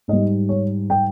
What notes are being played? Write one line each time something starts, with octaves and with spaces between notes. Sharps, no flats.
G#2 G3 D#5
C#5
G5